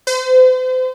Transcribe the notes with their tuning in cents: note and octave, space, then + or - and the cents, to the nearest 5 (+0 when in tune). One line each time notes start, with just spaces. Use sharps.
C5 -40